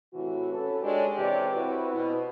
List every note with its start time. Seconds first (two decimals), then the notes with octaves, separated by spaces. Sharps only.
0.13 A2 C3 E3 F#4
0.52 C#4 A4 B4
0.81 G#3 D4 G4 A4 C#5
1.16 C3 E3 G4 C#5 D5
1.53 C4 E4 F#4 B4
1.90 B2 B3 E4